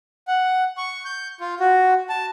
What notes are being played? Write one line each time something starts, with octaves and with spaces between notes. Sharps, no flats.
F#5
C#6
G6
F4
F#4
A5